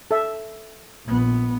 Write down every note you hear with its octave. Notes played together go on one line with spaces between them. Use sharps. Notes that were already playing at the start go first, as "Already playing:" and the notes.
A4 E5
A#1 B3